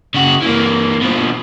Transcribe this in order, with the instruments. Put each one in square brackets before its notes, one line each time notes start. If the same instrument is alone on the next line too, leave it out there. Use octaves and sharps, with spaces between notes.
[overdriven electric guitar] C#3 F#4
E3 A#3
B2 F3